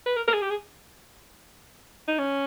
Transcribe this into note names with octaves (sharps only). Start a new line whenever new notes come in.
B4
A#4
A#4
G#4
G4
G#4
D#4
C#4